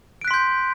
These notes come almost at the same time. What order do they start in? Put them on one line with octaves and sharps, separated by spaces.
D7 F#6 B6 C6 G6